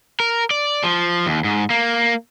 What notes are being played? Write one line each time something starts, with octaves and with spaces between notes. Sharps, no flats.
A#4
D5
F3
D#2
G#2
A#3